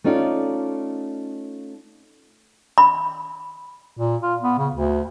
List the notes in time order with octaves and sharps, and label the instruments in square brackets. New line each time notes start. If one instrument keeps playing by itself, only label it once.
[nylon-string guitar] A3 C#4 D#4 F4 D5
[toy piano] B5
[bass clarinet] A#2
F4
B3
C#3
D2